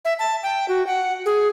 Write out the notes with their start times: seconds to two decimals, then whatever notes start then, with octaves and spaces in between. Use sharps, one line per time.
0.05 E5
0.19 A5
0.43 G5
0.68 F#4
0.87 F#5
1.26 G#4